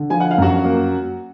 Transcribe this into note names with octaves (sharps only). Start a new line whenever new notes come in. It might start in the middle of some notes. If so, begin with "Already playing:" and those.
Already playing: D3
F3 G#5
F#5
F5
F#2 F#4 F#5
A#3